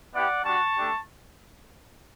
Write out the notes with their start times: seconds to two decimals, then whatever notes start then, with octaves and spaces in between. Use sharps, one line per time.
0.13 B3 E4 G4 D5 F#5
0.44 G3 D4 F#4 A5 C#6
0.75 A3 D4 G4